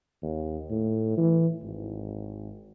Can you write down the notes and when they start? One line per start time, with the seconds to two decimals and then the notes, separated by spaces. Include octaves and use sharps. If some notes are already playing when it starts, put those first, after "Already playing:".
0.23 D#2
0.70 A2
1.17 E3
1.62 G#1